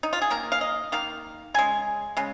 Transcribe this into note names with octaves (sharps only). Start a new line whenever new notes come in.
D#4
F4
G#4
D#3 A#3 A#4
F5
D#5
D#3 A#3 F5
C#3 G#3 G#5
C#3 G#3